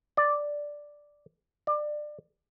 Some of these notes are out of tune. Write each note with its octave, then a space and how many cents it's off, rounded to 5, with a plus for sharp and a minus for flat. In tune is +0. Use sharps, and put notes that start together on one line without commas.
D5 +0
D5 +25